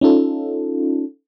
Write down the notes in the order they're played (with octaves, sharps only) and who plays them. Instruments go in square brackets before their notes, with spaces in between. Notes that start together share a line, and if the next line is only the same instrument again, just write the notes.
[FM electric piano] C#4 D#4 F4 A4